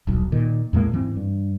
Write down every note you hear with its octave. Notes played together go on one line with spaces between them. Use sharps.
D#1 B1
A#2 D#3
E2 A2 G#3 A#3
G#2 E3 C4
G2